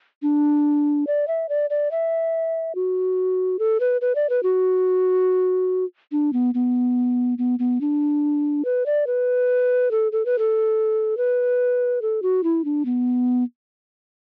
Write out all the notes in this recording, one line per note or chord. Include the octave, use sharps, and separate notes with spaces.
D4
D5
E5
D5
D5
E5
F#4
A4
B4
B4
D5
B4
F#4
D4
B3
B3
B3
B3
D4
B4
D5
B4
A4
A4
B4
A4
B4
A4
F#4
E4
D4
B3